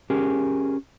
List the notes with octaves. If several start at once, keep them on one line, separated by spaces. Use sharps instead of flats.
C#4 G4 G#4 A#4